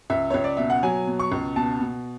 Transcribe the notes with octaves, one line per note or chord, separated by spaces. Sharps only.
C#2 E5
C#2 C#5
D5
B2 E5
F#5
F#3 G#5
B2
C#6
C#2
B2 A5
B2